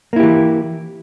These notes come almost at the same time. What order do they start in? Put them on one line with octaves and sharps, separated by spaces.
A#3 E4 G4 E3